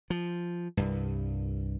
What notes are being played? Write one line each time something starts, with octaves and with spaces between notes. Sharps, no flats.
F3
C2 G2